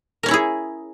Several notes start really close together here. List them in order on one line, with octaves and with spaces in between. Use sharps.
A#4 C#4 C#5 E4 G#4